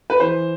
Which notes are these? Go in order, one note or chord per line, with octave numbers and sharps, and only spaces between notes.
B4
E3 C5